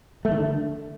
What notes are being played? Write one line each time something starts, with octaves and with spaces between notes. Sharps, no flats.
A3
D#3
D3